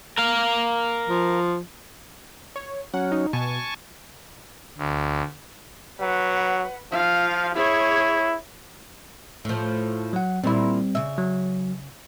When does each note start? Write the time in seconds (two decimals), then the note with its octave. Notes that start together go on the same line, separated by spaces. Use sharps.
0.18 A#4 F5
1.08 F3
2.56 C#5
2.94 F#3 C#4 F#5
3.12 D#4
3.33 B2 G#5 A5 C#6
4.78 D2
6.00 F#3 B4 F#5
6.92 F3 F4 F5
7.55 E4 G#4 C#5
9.45 A2 F3
10.13 F#3 F#5
10.44 A#2 G3 C4 E4
10.95 C#3 E5
11.18 F#3